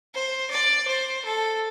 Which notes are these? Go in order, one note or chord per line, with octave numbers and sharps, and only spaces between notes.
C5
D5
C5
A4